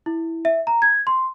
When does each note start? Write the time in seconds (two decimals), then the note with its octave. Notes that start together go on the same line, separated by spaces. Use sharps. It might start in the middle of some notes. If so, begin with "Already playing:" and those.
0.06 E4
0.45 E5
0.67 A#5
0.82 G#6
1.07 C6